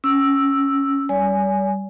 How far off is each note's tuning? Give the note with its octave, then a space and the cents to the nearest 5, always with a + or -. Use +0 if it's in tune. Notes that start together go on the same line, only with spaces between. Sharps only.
C#4 +0 E6 +0
G3 +0 D5 -45 G#5 +0